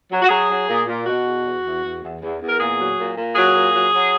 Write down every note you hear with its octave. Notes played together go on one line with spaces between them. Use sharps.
F#3
F#4
F#3 G#4
F#3
A#2
A#2
B2 F#4
E2
E2
E2
E2
E2
E2
E2
A#4
A#2 G#4
F#3
A#2
A#2
F#3 G#4
A#2
F#3
F#3